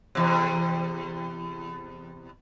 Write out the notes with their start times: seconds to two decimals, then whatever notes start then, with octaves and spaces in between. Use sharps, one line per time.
0.15 E2 C3